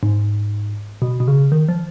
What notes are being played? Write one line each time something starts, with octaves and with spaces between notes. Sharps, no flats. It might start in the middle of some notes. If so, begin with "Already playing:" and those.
G#2
B2
B2
C#3
D#3
F3